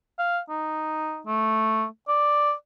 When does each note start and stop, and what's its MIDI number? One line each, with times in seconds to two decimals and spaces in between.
0.19 0.40 77
0.50 1.20 63
1.26 1.85 57
2.08 2.53 74